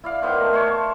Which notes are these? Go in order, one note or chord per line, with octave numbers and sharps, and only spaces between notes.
E4 D5 F5
D#3 B3 C5 D6
A3 A#4
C5 C#5
A5